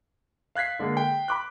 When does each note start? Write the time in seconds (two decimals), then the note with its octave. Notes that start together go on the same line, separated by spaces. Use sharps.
0.55 F5 F#6 G#6 B6 C7
0.79 D3 G#3 A#3
0.97 G5
1.28 B5 D6 F#6